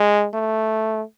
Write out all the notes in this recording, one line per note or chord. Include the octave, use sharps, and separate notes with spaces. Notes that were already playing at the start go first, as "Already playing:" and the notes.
Already playing: G#3
A3